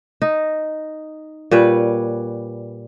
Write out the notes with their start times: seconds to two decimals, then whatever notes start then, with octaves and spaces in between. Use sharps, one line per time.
0.22 D#4
1.51 A#2 G3 B4 C#5